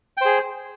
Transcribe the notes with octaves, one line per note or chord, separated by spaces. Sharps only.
G#4 C5 G5